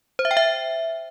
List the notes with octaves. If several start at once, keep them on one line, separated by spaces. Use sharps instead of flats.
C5
E5
G5
E5